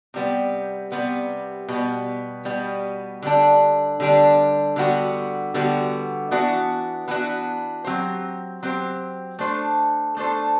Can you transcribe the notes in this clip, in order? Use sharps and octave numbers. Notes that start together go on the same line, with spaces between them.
C3 G3 B3
C3 G3 B3
B2 G3 B3
B2 G3 B3
D3 G3 D4
D3 G3 D4
D3 G3 B3 F#4
D3 G3 B3 F#4
E3 B3 D4 F#4
E3 B3 D4 F#4
F#3 C4 G4 C5
F#3 C4 G4 C5
A3 D4 A4 C5
A3 D4 A4 C5